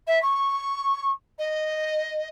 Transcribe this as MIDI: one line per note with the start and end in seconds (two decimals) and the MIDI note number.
0.07 0.21 76
0.22 1.10 85
1.38 2.27 75